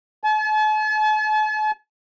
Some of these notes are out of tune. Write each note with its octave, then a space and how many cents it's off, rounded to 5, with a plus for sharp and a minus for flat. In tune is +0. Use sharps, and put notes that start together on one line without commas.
A5 -45